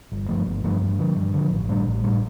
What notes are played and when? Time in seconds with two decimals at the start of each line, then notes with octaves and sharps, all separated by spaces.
0.12 G1
0.29 G2 F3 A3
0.47 G1
0.64 G2 F3 A3
0.81 G2
0.99 D3 F3
1.16 G2
1.34 D3 F3
1.51 A1
1.69 A2 G3 D4
1.87 A1
2.04 A2 G3 D4